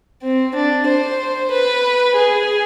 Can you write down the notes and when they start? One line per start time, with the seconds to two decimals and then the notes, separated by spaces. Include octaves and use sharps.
0.23 C4
0.54 D4
0.86 C5
1.51 B4
2.16 G#4